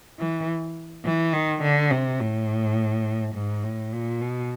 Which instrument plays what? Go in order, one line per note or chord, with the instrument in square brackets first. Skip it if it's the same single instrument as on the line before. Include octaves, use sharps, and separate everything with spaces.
[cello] E3
E3
D#3
D3
C3
A2
G#2
A2
A#2
B2